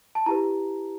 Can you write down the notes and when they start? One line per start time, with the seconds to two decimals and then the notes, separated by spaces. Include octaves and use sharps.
0.15 A5
0.26 E4 G4 B4 A#5